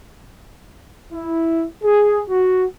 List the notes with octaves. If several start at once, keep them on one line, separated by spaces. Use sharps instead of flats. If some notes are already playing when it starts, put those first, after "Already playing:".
E4
G#4
F#4